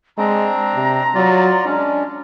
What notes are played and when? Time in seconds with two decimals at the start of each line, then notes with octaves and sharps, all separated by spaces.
0.18 G#3 C4 D4 A#5
0.75 C3
1.15 F#3 F4 D5
1.65 G#3 C#4 D4